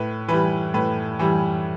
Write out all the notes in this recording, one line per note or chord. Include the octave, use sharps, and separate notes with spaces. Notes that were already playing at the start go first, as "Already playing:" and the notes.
Already playing: A2 B4
E3 G3 B4
A2 B4
E3 G3